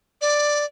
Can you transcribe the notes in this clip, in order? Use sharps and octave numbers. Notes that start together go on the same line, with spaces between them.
D5